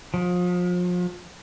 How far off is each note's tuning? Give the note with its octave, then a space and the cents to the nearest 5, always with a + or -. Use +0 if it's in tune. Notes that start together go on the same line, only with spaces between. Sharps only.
F3 +35